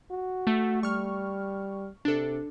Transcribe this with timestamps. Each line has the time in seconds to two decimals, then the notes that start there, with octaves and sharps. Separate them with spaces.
0.11 F#4
0.47 A3
0.83 G3 C#6 F6
2.05 C3 D4 A4